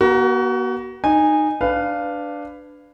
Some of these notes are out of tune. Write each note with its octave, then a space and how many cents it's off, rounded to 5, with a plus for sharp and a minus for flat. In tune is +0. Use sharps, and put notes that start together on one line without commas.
B3 -40 F#4 +30 A#4 +10
D#4 -15 G#5 -15
D4 +0 B4 +20 F5 +0